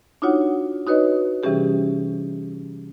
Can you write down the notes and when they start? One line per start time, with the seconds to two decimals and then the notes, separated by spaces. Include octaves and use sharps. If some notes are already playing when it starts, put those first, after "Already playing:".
0.22 D4 D#4 F4 F#4 C#5 F#5
0.87 D#4 F#4 B4 C#5 D#5
1.43 C3 E3 G3 C#4 G4 G#4